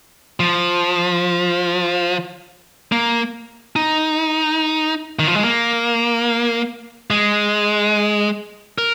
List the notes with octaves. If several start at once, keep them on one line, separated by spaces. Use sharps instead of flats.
F3
A#3
D#4
D#3
F3
G#3
A#3
G#3
A#4